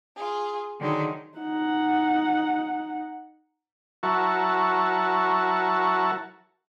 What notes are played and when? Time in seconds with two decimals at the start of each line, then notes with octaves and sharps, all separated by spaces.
0.16 F4 G#4
0.80 D3 D#3 F#3 G#3 D#4
1.38 D#4 F#5
4.03 F#3 E4 F#4 A#4 A5 C#6